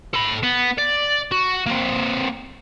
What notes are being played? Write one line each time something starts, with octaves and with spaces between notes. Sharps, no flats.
A4 B5
B3
D5
F#4
A#3 C4